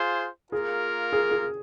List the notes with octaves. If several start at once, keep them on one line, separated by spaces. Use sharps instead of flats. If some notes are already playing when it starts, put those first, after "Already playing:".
Already playing: F4 G#4 C5
A#3 F4 G#4 A#4
G#4
G#4